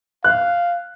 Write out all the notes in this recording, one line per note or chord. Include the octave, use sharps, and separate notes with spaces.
F5 F#6